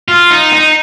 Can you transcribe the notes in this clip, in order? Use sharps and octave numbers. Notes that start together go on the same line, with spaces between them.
F4
D#4
D#4